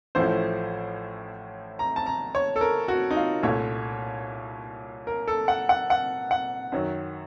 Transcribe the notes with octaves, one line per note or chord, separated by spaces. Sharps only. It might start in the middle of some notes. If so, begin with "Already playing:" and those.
A1 A2 F3 A3 C#4 C5
A#5
A5
A#5
C#5
A4
A#4
F#4
D#4
F4
C2 A#2 A3 C#4 C#5
A#4
A4
F#5
F#5
F#5
F#5
F#2 D#3 F#3